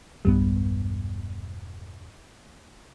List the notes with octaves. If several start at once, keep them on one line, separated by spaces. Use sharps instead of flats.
E1 B1 G2 G3 B3